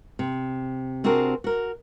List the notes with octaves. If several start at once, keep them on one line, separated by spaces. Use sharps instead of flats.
C3
C3 C4 D4 F#4 G#4 A#4
F#4 A#4